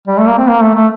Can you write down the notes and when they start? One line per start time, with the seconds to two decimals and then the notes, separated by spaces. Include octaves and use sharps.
0.08 G3
0.18 A3
0.28 A#3
0.38 C4
0.48 A#3
0.62 A3
0.75 A3